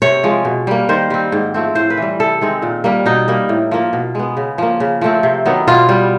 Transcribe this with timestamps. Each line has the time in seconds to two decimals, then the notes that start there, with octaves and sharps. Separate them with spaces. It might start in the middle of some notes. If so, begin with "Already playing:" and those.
0.02 C3 C#5
0.24 F3 G#3
0.45 B2
0.67 G3 A#3
0.89 D#3 C5
1.10 G3 C4
1.32 G#2
1.54 F3 A3 C4
1.75 A2 C5
1.90 B4
1.97 E3 G3
2.20 C3 A4
2.41 D#3 G#3 C4
2.62 A#2
2.84 G3 A#3
3.06 B2 D#4
3.28 G3 A#3
3.49 A2
3.71 F3 A#3
3.93 B2
4.15 G#3 B3
4.37 C#3
4.58 F3 A#3
4.80 C#3
5.01 F3 A3 C4
5.23 C3
5.45 D#3 F#3 B3
5.67 B2 F4
5.89 G3 B3